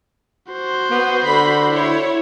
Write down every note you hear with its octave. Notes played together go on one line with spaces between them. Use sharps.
F#4 C5
B3
D3 B5
E4 C#5